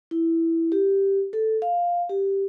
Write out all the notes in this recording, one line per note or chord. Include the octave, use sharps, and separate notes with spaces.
E4
G4
A4
F5
G4